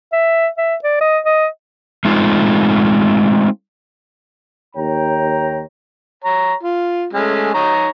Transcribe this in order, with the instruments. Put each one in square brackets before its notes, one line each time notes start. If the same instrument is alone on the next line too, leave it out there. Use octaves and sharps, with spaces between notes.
[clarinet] E5
E5
D5
D#5
D#5
[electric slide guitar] G#3 A3 C4 D#4 F4
[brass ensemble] D#2 C#5 G5 A#5
[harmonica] C#5 A#5
F4
G#3 A3 C#4
D#4 C#5 A#5